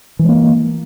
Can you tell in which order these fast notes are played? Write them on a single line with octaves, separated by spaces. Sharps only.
E3 G#3 A#3